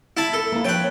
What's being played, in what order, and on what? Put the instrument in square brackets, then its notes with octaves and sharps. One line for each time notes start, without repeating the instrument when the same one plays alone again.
[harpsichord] E4 A5 B5
A4
[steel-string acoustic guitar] A#3 E4
[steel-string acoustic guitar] F3 D4 C#5 [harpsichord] B4 G5